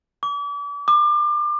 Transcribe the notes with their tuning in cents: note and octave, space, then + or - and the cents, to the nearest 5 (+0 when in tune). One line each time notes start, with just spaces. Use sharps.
D6 -40
D6 +30